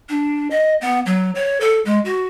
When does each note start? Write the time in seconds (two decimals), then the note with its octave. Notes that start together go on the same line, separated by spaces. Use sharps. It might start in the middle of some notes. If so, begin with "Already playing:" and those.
0.09 D4
0.51 D#5
0.81 B3
1.06 F#3
1.35 C#5
1.60 A4
1.85 G#3
2.05 F#4